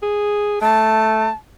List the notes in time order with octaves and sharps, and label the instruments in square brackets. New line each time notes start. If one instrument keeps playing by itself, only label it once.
[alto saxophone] G#4
[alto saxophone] A3 [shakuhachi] A5